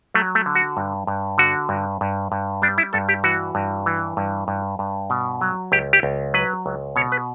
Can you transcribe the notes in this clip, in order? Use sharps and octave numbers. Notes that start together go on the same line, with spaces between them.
F#3 A3
A3
D3
F#4
G2
G2
D3 F#4
G2
G2
G2
G3 D4
E4
G2 A4
G4
E3 F#4
G2
E3
G2
G2
G2
B2
F#3
C#2 G4
G4
C#2
F#3 B4
C#2
B2 C#5
B4